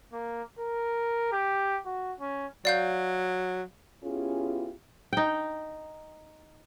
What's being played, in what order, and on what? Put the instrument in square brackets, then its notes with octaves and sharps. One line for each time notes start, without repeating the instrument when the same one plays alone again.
[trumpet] A#3
A#4
G4
F#4
C#4
[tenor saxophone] F#3 [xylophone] D5 F5 G6
[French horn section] B3 C#4 E4 F4 G4 G#4
[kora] D#4 G5